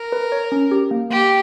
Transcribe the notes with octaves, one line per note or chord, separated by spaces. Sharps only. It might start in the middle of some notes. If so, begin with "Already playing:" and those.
Already playing: A#4
B4
C#5
C#4
G4
A#3
A#3 G4